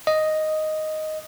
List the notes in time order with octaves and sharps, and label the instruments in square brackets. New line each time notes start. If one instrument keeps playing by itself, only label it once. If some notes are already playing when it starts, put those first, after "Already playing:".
[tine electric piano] D#5